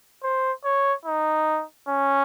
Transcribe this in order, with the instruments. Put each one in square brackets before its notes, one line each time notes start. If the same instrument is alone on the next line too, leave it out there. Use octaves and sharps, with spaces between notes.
[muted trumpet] C5
C#5
D#4
C#4